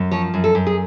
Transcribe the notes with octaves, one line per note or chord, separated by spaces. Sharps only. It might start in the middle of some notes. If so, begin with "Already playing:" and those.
Already playing: F#2
F3 C#5
F#2
A4
F#2
G#4